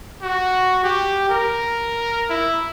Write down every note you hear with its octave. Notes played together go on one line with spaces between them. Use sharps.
F#4
G4
A#4
E4